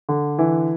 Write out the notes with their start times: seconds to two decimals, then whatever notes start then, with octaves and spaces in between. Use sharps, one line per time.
0.09 D3
0.39 E3